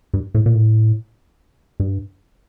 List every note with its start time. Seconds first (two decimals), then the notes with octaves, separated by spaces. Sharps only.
0.14 G2
0.35 A2
0.46 A#2
0.55 A2
1.80 G2